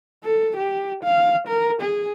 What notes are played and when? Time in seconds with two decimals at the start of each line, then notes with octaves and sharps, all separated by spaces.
0.24 A4
0.57 G4
1.04 F5
1.47 A#4
1.81 G#4